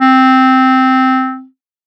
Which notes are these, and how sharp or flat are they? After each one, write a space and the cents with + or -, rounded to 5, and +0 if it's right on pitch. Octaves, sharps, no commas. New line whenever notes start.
C4 -5